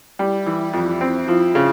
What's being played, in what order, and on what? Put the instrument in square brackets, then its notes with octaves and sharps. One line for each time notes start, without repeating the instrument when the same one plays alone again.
[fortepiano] G3 [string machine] E4
[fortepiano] E3
[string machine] E4
[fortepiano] F2
C4
F3
C#3